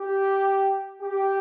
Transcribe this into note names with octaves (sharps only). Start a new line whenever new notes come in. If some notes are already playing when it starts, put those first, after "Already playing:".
Already playing: G4
G4